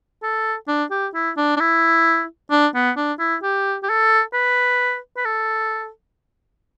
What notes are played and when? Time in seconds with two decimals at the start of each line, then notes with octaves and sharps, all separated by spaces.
0.23 A4
0.68 D4
0.91 G4
1.14 E4
1.37 D4
1.57 D4
1.60 E4
2.51 D4
2.75 B3
2.97 D4
3.19 E4
3.43 G4
3.83 G4
3.89 A4
4.34 B4
5.17 B4
5.25 A4